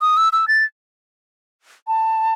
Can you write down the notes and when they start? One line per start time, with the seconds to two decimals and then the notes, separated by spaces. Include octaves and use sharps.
0.02 D#6
0.17 E6
0.33 E6
0.48 A6
1.87 A5